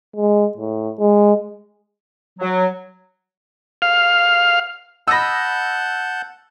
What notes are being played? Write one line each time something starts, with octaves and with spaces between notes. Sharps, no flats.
G#3
A2
G#3
F#3
F5
D#5 F#5 A5 B5 E6 G6 A#6